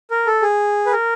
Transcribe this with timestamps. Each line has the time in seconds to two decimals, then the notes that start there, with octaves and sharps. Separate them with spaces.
0.11 A#4
0.26 A4
0.42 G#4
0.86 B4
0.92 A#4